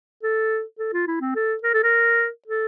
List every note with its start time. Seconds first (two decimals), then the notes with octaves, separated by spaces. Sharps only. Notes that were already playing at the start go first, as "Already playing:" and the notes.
0.23 A4
0.79 A4
0.93 F4
1.07 E4
1.21 C4
1.35 A4
1.64 A#4
1.74 A4
1.84 A#4
2.48 A4